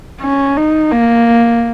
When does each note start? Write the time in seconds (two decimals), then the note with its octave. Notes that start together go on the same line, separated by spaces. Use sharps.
0.21 C#4
0.57 D#4
0.91 A#3